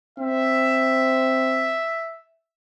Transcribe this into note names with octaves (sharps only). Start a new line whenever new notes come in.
C4 E5